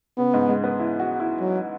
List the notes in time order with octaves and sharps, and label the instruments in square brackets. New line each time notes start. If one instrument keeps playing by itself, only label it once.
[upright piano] C#3 [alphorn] B3
[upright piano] G#2
G#3
B3
E4
F#4
E4
[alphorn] F#3